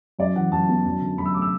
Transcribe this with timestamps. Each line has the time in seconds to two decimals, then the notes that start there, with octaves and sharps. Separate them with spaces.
0.19 F#2 D5
0.35 E3 F#5
0.52 F#2 A5
0.69 B3
0.85 F#2
1.01 D3
1.18 F#2 B5
1.25 E6
1.34 A3 D6
1.42 E6